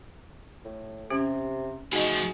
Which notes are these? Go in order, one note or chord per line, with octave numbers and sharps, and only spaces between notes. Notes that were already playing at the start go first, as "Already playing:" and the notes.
A2
C3 C#4 G4
A2 F3 D#4 F#4 G#4 D#5